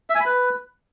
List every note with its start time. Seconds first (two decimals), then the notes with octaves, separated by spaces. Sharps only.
0.10 E5
0.15 G#5
0.20 B5
0.26 B4